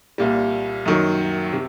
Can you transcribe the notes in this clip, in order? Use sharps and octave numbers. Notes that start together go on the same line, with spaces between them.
C2 A#2 G3
F#2 D#3 F#3
C3